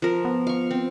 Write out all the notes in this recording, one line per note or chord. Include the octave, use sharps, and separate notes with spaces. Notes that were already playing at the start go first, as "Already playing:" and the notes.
F3 A#4
B3
F5 C#6
C4